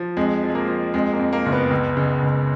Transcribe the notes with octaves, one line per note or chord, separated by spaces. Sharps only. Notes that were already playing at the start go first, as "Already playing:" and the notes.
Already playing: F3
F2 G#3
F3
G#3
A#3
F3
F2 G#3
A#3
F2
A#3
F#1
B3
C#2
C#3
C#2